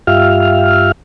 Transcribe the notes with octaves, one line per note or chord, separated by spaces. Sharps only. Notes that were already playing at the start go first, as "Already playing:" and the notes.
G2 F4 G4 E5 F5 F6